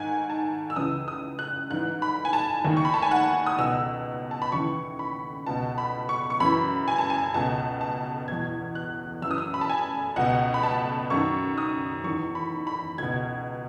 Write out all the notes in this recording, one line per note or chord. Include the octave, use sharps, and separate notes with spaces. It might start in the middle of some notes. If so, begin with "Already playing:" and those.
Already playing: G#2 D#3 G#5
A5
E6
C#2 C#3 E3 D#6
D#6
F#6
G#2 E3 F#6
B5
G#5
A5
D#2 D#3
C#6
B5
A5
G#5
F#5
D#6
C#2 B2 E6
A5
B5
D#2 C#3 E3 C#6
B5
C#2 B2 A5
B5
C#6
C#6
F#2 E3 B5
G#5
A5
G#5
C#2 B2 A5
A5
E2 B2 G#6
F#6
F#2 E3 E6
D#6
E6
B5
A5
G#5
C#2 B2 F#5
B5
A5
F#2 D#3 C#6
D#6
E2 D#3 C#6
B5
B5
C#2 B2 G#6